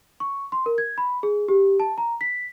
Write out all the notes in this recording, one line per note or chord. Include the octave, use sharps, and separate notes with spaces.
C#6
C6
A#4
G#6
B5
G#4
G4
A5
A#5
B6